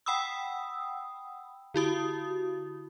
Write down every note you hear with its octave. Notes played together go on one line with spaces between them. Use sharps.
F#5 G5 B5 D#6 E6
D3 E4 F#4 D#6